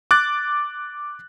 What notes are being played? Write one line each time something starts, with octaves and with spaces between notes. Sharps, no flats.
D6 F#6 A6